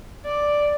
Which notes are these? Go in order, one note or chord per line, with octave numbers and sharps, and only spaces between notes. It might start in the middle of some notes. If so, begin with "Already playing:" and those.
D5